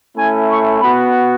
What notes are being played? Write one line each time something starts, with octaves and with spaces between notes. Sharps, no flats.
A3 C#4 E4 G#5
C#6
B3 F#4 B5